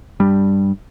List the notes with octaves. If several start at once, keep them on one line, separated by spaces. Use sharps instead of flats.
G2 G3